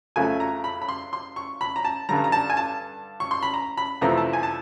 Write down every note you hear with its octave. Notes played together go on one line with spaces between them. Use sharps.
F2 C#3 F#3 A3 G#5
A#5
B5
B5
C6
C6
C#6
B5
A#5
A5
G2 D3 G3 A#5
A#5
A5
G#5
A5
C#6
C6
B5
A#5
B5
F2 C3 E3 A3 A#5
A5
G#5
A5